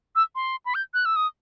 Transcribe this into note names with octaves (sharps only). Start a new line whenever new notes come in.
E6
C6
B5
G6
F#6
E6
D#6